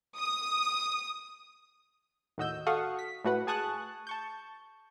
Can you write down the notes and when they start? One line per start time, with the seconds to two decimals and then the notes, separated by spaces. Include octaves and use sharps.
0.16 D#6
2.38 D#2 A2 F#4 D#5 E6 G6
2.67 F#4 A4 F5 F#5 C#6 D#6
2.99 B6
3.25 A2 A3 F#4 B4 F#5
3.47 G#4 G#5 A5 C#6 D#6 F#6
4.07 A5 C#6 G6